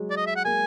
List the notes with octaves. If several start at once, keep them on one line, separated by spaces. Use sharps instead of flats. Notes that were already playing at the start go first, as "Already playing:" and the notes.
Already playing: F#3 G#3
D5
D#5
E5
F#5
G#3 A#3 G#5